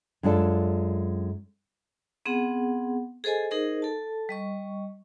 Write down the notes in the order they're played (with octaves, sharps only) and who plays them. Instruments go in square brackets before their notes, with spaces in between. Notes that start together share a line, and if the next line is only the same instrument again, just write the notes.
[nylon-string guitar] F#2 G#3 D4 F4 A4
[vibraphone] B3 C4 G#4 F#5
G#4 A4 C5 D#5 G#5
D#4 G#4 A#4 C5 D#5
A4 A5
G3 D#5 C#6